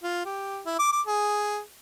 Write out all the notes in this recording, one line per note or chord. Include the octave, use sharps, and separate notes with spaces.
F4
G4
E4
D6
D6
G#4